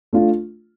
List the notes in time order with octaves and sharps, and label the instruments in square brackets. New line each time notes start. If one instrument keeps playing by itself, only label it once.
[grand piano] A3 D4 F4